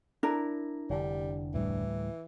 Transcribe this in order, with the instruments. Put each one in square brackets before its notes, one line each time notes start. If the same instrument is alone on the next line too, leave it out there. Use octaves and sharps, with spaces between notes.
[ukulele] D4 E4 A#4
[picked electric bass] F1 D3 [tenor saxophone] G3
[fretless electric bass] D2 A2 G3 [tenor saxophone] E3